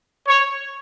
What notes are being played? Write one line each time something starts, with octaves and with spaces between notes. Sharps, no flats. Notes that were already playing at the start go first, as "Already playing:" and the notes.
C#5